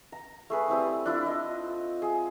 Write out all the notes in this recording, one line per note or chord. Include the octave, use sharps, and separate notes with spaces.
A#5
A3 G#4 B4
G3 C4 E4 D#6
D4 E4 F4
D#5
G#4